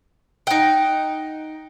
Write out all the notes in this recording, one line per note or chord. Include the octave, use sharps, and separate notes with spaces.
D#4 F#5 G5